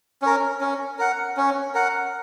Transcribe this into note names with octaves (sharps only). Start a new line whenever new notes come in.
C#4 A#4
C#4
A#4 F#5
C#4
A#4 F#5